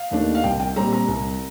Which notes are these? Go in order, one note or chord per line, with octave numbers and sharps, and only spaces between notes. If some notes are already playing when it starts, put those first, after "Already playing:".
Already playing: F5
D#2 D#3 A3 D4
F5
C2 G5
G5
A#2 G3 C4 A#5
A#5
C2